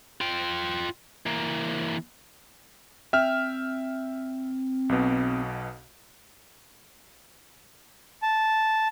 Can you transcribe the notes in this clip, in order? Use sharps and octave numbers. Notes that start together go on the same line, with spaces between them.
F4 G5
E3 A#3
C4 E5 G5 F6
B1 B2
A5